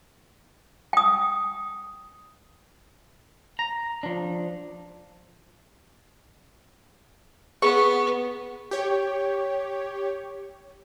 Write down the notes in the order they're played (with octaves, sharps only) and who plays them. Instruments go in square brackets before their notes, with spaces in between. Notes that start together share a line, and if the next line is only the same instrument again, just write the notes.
[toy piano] G5 D#6
[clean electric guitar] A#5
F3 D4
[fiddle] B3 [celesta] G#4 [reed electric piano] B4 [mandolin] C#6
[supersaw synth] G4 C#5